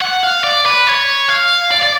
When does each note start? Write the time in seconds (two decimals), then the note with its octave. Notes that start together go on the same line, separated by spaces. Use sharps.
0.02 F#5
0.24 F5
0.44 D5
0.66 B4
0.87 C#5
1.29 F5
1.71 D5
1.82 D5